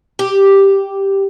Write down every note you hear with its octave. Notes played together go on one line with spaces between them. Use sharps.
G4